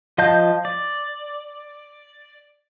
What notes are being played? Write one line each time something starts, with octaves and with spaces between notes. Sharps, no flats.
F3 D#5 F5 A5 G6
D5